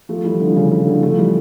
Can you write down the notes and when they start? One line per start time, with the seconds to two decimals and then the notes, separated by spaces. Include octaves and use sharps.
0.09 F3 A3
0.25 E3 G3
0.40 D3 F3
0.56 C#3 E3
0.71 C#3 E3
0.86 D3 F3
1.03 F3 A3
1.18 E3 G3